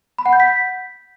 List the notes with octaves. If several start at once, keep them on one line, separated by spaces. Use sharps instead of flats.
B5
F#5
G6
B6